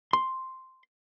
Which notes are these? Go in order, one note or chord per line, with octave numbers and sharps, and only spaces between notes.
C6